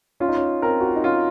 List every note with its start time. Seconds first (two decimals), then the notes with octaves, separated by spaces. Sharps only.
0.20 C#4 F4
0.29 D#4
0.37 C#4
0.62 C4 A#4
0.81 F#4
0.89 F4
0.96 D#4
1.04 C#4 F4